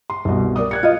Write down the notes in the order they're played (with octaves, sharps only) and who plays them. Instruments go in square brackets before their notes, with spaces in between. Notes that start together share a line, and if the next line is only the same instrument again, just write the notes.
[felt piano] C6
C2 B2
A#4 D5 D#6
F#6 G#6 C#7
[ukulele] F4 D#5